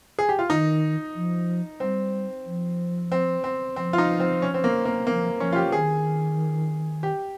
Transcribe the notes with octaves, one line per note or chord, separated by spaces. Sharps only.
G#4
G4
F4
D#3 D#4
F3
G3 C4
F3
C4
C4
F3 C4
F4
D#4
C4
C#4
C4
A#3
A#3
F3 A#3
F3 C#4
F4
G4
D#3 G#4
G4